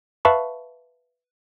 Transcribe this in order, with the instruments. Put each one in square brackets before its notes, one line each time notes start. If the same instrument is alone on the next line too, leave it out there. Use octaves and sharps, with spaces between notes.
[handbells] B4 E5 F5 A5 B5 C#6